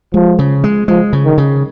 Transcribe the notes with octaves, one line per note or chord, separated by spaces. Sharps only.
F3 G#3
C#3
G#3
F3 G#3
C#3
D#3
C#3